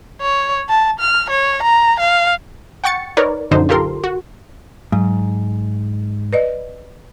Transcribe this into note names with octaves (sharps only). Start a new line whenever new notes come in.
C#5
A5
F6
C#5
A#5
F5
F#5 G5 C#6 A6 C#7
D#4 A#4 B4 C#5 D5
A#1 F#2 D3 D#4 C5
F4 G4 A4 A#4 C6
F#4
G#2 F#3
B4 D5 D#5